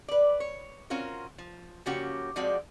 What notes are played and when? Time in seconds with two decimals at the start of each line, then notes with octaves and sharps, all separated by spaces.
0.08 B4 D5
0.40 C#5
0.90 C4 C#4 F4 F#4 A#4
1.38 F3
1.86 C#3 F3 A#3 C#4 F#4 G4
2.36 F3 G#3 C4 F#4 D5